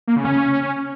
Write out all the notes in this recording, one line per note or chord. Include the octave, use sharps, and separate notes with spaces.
A#3
C#3
C#4